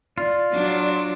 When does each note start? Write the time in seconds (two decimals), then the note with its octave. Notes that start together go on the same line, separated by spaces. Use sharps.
0.18 F4 D5
0.53 F#3 D4